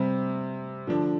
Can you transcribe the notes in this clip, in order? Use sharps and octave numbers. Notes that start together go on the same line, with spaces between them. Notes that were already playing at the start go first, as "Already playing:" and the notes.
Already playing: C3 G3 C4
D3 F3 D4